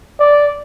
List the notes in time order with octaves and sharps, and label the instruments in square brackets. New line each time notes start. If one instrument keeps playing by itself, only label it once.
[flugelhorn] D5